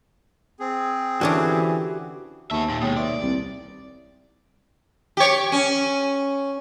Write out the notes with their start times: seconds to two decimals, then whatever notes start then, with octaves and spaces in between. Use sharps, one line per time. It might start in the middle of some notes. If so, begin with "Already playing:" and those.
0.60 C4 G#4
1.21 D3 E3 C#4 D4 F#4 G4 D6
2.51 D#2 B3 E5 A5 C#6
2.69 A#2
2.81 B2 G#3 C#5 G5 D#6
2.97 B4 D5 E5 C6
3.22 C2
5.17 G4 C#5
5.52 C#4